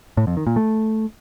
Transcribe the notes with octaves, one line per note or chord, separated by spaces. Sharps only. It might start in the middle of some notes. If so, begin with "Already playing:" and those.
A2
F2
D#3
A#2
A3